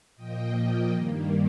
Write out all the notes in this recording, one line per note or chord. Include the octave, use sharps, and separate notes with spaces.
A#2 F3 A#3 D#5 G5
D#5 G5
G2 D#3 G3 A#3